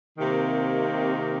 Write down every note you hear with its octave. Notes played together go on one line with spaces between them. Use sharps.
C3 D#3 A#3